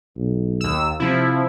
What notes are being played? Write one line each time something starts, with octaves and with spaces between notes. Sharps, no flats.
B1
D#2 E6
C3 F3 E4